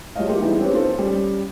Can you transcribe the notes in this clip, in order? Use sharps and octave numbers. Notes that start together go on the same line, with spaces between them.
F3 G3 G#3 C#5 D#5 F5
A#3 E4 F4 G4
E3 G3 G#3 B3 D#4 E4
C4 C#4 G4 B4 C#5
A#3 C4 D#4 F4 A4 C5
G3 C#4